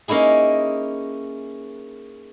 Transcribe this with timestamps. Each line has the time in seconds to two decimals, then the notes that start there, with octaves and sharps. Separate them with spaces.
0.08 A#3 C#4 D#4 E4 G#4